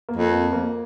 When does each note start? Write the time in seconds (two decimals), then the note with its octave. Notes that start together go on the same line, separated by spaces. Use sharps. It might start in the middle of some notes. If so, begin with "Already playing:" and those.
0.09 A#3
0.16 F2
0.31 A#3
0.53 A#3